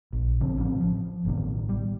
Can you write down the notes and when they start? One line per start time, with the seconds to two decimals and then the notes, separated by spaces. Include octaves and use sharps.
0.13 A#1
0.41 C#3 F3 C4
0.58 A1 F3 C4 C#4
0.80 F3
1.25 A1 B2 D#3
1.69 G3